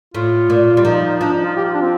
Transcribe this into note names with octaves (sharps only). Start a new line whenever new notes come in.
A2 F4
A#2
G3
F3 D#4
F3 D4
D#4
F4
G4
F4
D4
C4